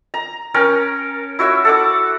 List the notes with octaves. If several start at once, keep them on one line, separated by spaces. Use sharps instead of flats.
A#5
C#4 A#4 G5 A5
E4 F#4 C#5 E5
A4 F#5 D6